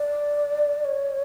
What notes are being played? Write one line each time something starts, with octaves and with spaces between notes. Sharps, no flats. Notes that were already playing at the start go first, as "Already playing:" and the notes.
Already playing: D5
C#5